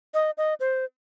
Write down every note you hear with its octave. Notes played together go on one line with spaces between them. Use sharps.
D#5
D#5
C5